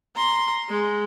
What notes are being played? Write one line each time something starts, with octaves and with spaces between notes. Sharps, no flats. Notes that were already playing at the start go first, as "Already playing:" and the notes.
A#5 C6
G#3